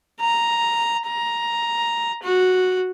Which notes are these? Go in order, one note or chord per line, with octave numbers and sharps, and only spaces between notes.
A#5
A#5
F#4